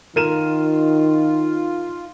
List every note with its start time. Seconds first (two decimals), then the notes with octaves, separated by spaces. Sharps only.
0.16 D#3 D#4 F4 A#4 D#7 E7